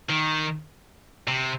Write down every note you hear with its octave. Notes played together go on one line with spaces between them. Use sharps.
D#3
C3